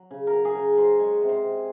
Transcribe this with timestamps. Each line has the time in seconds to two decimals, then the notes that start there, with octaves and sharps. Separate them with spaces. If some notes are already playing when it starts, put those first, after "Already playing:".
Already playing: F#3
0.11 C#3
0.27 A#4
0.33 F#3 G#4
0.45 G#4
0.55 C#3 A#4
0.77 F#3 C5
0.99 G#3 C#5
1.22 C3
1.29 C5
1.44 C3